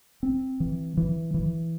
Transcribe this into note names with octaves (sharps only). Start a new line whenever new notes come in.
C4
E3
E3
E3